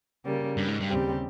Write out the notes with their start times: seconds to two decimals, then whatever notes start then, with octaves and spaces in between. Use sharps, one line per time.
0.25 C#3 G3 A#3
0.57 G2
0.68 G#2
0.80 G2
0.89 D#2 C#3 G3 C4 G4